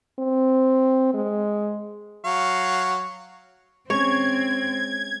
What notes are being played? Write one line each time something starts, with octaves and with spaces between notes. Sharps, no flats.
C4
G#3
F#3 F5 C#6
G#3 C4 C#4 C#5 G#6